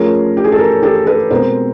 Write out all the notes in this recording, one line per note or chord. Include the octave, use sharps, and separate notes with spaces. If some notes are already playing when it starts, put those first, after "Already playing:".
Already playing: F3 A3 C#4 G#4 A#4
G4
G#4
A4
G#4 A#4
G4 A4
A4 B4
B2 G#3 C4 A#4 C5